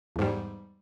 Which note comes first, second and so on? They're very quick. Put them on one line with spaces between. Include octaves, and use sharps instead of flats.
E2 G#2 G3